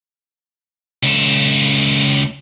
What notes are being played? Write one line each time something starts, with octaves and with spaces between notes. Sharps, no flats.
C#2 A4